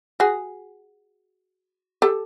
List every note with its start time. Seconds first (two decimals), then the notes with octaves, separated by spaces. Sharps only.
0.20 F#4 G#4
2.02 G4 A4